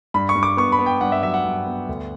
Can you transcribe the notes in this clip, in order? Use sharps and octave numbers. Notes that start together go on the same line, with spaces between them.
G2 B5
C#6
G2
D6
B3 C#6
B5
B3
G5
G2 F#5
E5
F#3 E5
F#5
G2
B3
D2